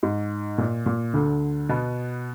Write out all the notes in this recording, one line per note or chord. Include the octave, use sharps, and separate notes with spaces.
G#2
A#2
A#2
D2 D3
B2 B3